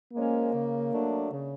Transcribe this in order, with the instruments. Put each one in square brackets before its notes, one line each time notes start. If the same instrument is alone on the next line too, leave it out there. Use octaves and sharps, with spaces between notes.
[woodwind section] F3 G#3 C#4 [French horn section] A#3
[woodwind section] C#3
F#3 A3 D4
C#3